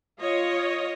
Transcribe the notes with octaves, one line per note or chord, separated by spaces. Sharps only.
F4 C#5 D#5